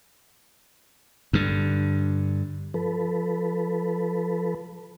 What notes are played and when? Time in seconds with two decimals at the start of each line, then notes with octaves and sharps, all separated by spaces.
1.33 G2 D3
2.74 F3 A4 B4